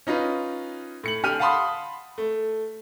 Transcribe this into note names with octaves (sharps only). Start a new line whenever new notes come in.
C#4 D#4 F4 B4
A2 C#7 F#7
D3 G4 F6 D#7
F5 F#5 A5 B5 C6 D#6
A3